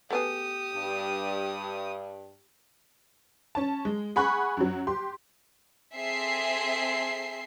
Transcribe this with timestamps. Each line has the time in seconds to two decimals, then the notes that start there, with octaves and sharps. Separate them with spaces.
0.10 A3 B3 G4 G#4 D#6
0.74 G2
3.55 C#4 A5
3.85 G#3
4.16 G#4 F#5 B5 C#6 F#6
4.57 F#2 F#3
4.87 G4 C6
5.96 C4 G#4 A4 E5 C6 C7